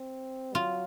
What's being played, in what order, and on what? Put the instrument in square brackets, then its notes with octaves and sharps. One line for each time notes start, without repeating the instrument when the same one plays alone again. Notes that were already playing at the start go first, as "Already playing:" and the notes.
Already playing: [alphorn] C4
[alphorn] F#3 [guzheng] F4